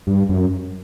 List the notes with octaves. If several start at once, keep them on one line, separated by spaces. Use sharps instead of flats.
G2
F#2